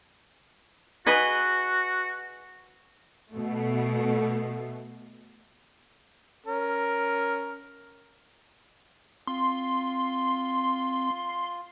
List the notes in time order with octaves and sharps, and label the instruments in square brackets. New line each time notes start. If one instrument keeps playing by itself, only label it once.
[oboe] F#4 [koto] G#4 B4 D#5
[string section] B2 A3
[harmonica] C#4 A#4
[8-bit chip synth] C4 [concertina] F4 [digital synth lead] C6